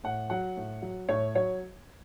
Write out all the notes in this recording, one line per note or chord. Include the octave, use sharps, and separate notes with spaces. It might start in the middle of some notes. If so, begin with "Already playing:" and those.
A2 F#5
F#3 F#5
A2
F#3
A2 C#5
F#3 C#5